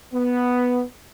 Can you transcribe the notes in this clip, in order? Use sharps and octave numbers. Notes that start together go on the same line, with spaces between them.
B3